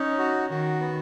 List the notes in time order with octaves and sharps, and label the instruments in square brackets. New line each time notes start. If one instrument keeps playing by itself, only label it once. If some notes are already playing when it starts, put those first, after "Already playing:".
Already playing: [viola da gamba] C#4 [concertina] D#4
[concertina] F#4
[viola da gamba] D#3 [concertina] F#4
[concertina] B3